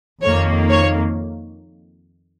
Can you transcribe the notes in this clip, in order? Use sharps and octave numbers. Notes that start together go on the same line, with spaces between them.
F2 D#3 A#3 C#5
C#5